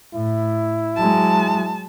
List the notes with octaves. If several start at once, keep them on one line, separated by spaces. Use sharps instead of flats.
A2 E4
F#3 G#3 A5